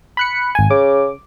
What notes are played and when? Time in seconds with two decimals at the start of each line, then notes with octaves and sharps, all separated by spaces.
0.17 B5 F#6 C#7
0.55 G#1 G#5
0.70 C#3 D6